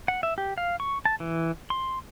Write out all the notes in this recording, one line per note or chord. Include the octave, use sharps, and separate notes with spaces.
F#5
E5
G4
F5
C#6
A5
E3
C6